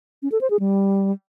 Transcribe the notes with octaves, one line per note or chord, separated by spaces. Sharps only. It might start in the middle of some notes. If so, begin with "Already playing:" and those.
C#4
A4
C5
G#4
G3